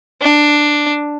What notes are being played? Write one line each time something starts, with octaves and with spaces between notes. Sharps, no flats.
D4